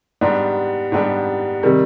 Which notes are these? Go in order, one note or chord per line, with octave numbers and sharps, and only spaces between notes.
G#2 G3 B3 D4 G4
G#2 G3 B3 D4 G4
C3 D#3 G3